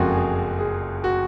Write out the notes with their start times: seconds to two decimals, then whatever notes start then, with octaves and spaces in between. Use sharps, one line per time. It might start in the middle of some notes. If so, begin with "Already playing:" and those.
Already playing: F#1 F2 C#3 F3 G#3 F4 F#4
0.13 G#4
0.59 G#4
1.04 F#4